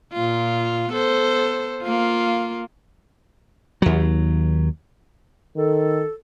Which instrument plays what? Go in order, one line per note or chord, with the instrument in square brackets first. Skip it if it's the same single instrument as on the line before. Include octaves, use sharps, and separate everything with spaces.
[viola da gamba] A#2 F4
B3 A4 C5
A#3 F4
[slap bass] D#2 F#3
[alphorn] D#3 [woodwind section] A4